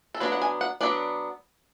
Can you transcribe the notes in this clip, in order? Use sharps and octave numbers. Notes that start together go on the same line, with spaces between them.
A4
F#3 B3 D4 B4
F#5
G#5
F#5
F#3 B3 D4 D5